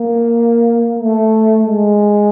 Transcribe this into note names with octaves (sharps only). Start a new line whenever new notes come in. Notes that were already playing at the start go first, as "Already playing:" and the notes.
Already playing: A#3
A3
G#3